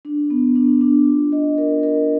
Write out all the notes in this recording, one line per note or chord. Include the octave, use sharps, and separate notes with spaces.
D4
B3
D4
D4
F4
D#5
A#4
A#4